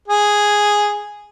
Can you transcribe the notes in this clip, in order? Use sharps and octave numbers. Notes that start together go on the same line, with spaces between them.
G#4